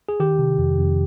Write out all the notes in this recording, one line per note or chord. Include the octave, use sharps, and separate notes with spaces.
G#4
D#3 G4
C3
F2
F2